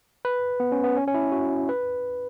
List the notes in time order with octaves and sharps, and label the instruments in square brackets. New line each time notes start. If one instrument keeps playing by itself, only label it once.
[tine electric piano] B4
B3
C#4
B3
C#4
C#4
E4
F#4
B4